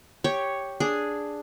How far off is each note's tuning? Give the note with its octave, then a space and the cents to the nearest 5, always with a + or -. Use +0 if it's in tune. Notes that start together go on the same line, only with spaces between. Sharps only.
G4 +0 C#5 +0
D4 +0 G#4 +0